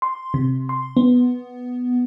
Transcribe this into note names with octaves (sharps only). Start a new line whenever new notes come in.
C6
C3
C6
B3